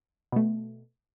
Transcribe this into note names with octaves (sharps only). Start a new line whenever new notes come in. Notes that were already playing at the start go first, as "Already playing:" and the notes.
B2 A3